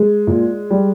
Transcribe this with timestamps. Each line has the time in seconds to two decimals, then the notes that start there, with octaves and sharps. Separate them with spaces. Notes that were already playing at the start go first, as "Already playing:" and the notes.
Already playing: G#3
0.27 A#2
0.70 G3